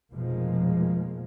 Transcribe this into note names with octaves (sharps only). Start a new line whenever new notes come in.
F1 B2 F3 G#3 A#3